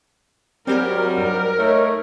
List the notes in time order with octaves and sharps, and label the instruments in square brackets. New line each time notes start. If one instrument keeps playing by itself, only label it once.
[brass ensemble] G#2 F#3 [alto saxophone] G3 [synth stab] C4 G4 G#5 [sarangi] A#4
[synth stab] G2 [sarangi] A#4
[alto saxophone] A3 [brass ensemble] D#4 C#5